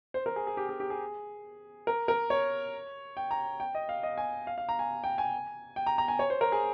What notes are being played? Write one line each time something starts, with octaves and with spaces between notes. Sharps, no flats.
C5
A#4
G#4
G#4
G4
G#4
G4
G#4
A#4
A#4
C#5
G5
A#5
G5
D#5
F5
D#5
G#5
F5
F5
A#5
G#5
G5
G#5
G5
A#5
A#5
G#5
C#5
C5
A#4
G#4